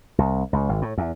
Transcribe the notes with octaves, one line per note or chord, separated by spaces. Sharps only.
C2
C#2
G#1
A2
E2